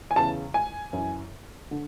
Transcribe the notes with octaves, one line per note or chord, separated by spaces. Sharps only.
G#5
E2 C#3 E3 A5
G#5
F#2 E3
D3